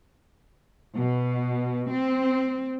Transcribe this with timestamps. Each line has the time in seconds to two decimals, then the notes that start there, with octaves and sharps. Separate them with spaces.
0.96 B2
1.91 C4